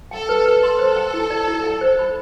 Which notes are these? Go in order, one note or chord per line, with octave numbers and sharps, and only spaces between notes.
A4 G5
B4
B4
A4 C6
C5
G5
E4
D5
E4
G5
C5
B5